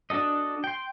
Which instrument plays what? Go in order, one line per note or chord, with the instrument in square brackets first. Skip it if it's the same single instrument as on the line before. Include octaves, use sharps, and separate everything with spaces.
[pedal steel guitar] D4 F#4 A4 D#5
G5 C6